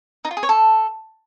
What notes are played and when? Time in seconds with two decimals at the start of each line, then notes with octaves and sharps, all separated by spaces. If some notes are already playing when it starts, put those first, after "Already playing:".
0.25 D#4
0.31 F4
0.37 G#4
0.43 C#5
0.49 A4